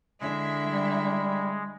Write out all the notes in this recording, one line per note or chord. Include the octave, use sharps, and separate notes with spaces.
D3 G#3 E4 E5
G3